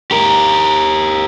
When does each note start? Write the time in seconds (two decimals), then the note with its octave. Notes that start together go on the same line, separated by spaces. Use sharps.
0.11 G4 A#4